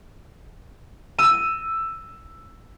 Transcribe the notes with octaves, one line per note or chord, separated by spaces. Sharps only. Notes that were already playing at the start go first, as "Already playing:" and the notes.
E6 D#7